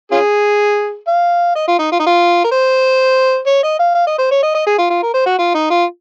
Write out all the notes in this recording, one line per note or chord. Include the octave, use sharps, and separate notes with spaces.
C#4 F4 G#4
F5
D#5
F4
D#4
F4
D#4
F4
A#4
C5
C#5
D#5
F5
F5
D#5
C5
C#5
D#5
D#5
G#4
F4
F4
A#4
C5
F#4
F4
D#4
F4